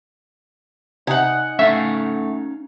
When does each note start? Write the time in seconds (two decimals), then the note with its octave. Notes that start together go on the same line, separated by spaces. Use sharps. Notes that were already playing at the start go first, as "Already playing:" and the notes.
1.07 C3 D#4 F#5 G#5
1.59 A3 C#4 D#4 E5 F5